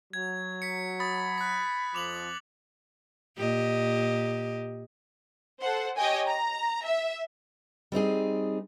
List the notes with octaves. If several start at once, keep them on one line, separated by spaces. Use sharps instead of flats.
F#3 G#6
B6 C#7
B5 D#6 A6
F#6 B6
F2 F3 D6 F7 F#7
A#2 G4 D#5
A4 C5 F#5
G4 C#5 D#5 G5 G#5
A#5
E5
G3 C4 D#4 G#4